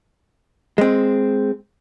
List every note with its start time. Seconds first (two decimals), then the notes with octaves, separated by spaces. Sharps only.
0.78 G#3 C4